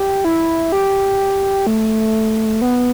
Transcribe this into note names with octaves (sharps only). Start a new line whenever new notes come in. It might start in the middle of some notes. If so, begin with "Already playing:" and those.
Already playing: G4
E4
G4
A3
B3